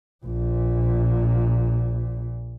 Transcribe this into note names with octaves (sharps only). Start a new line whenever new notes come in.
A#1 A#2